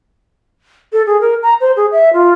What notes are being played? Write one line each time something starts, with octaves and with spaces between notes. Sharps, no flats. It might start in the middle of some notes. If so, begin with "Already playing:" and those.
A4
G#4
A#4
A#5
C5
G#4
E5
F4